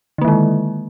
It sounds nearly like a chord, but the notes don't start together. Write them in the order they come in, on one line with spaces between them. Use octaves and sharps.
D3 A#3 D#3 G#3